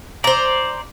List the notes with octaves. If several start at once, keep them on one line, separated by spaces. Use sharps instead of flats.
C5 D5 A#5